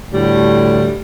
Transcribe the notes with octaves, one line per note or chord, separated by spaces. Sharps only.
D2 A2 G3